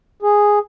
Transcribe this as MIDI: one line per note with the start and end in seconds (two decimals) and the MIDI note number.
0.22 0.59 68